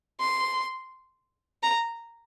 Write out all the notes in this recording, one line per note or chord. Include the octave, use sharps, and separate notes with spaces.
C6
A#5